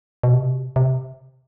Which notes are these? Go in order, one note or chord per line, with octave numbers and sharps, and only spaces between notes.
B2
C3
C3